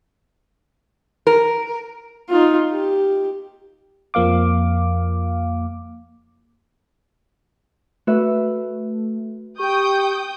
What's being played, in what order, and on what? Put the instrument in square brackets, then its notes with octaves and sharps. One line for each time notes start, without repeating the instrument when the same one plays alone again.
[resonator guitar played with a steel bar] A#4
[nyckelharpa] D#4 F4
G4
[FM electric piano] F2 F3 A#3 F5 D6
[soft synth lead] A3 [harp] F#4 B4 E5
[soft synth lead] G4 [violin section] G5 D#6 G6 [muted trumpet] C#6